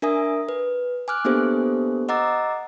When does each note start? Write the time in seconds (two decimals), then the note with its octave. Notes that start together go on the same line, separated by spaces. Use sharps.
0.02 D4 A#4 E5 G#5 D#6
0.49 B4
1.08 G#5 D6 F6 F#6
1.25 A#3 B3 D4 G4 A4 C5
2.09 D#5 F#5 A#5 D6 E6 A6